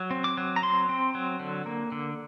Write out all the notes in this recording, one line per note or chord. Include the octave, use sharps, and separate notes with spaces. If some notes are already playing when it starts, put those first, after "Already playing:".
Already playing: F#3
C4
D6
F#3
A#5
C4 C6
C4
F#3
D3
A#3
D3